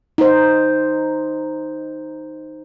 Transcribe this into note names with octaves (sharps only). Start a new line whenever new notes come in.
D#4 C5